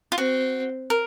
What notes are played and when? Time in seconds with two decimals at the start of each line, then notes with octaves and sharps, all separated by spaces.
0.12 F4
0.18 C4 F#4
0.90 A#4